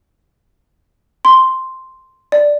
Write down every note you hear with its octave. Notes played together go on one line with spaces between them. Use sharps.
C6
D5